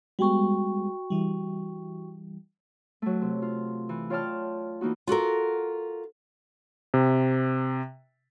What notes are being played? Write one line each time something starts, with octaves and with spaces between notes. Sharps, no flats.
G3 G#3 B3 F#4 G5 C#6
E3 G3
F#3 A3
C3
F4
E3
F4 C#5 D5 G5 A5 F6
E3 A#3 D#4 F#4
F4 F#4 A4 A#4
C3